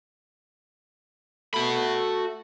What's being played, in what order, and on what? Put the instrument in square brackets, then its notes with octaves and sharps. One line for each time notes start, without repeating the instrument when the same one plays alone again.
[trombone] A3 [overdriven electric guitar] F#4 B5